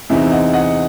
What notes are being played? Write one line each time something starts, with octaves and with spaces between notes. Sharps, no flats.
E2 C3 E3 C4 D#4 E5
D#5 F#5
D#5 F#5